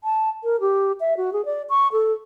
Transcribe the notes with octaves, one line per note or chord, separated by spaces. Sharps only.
A5
A#4
G4
E5
F#4
G#4
D5
C#6
A4